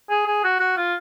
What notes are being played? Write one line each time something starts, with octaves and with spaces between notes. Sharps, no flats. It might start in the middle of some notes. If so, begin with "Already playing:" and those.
G#4
G#4
F#4
F#4
F4